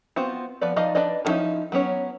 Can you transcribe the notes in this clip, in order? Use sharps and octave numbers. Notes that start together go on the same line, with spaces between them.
B3 C4 F4 F#4 C5
F3 B3 B4 D5
F3 D#4 D5 D#5 F5
D4 B4 D5 D#5
F3 B3 C#4 D#4 E4
F#3 B3 C#4 C#5